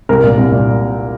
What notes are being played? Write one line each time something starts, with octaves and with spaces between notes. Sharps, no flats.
C2 A#4
A#2
C2
A#2